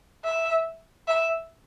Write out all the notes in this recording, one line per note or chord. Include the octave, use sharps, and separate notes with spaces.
E5
E5